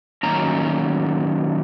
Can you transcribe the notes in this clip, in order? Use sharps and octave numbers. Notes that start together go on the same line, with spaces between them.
F#2 D#3 A#3 C#4 A#5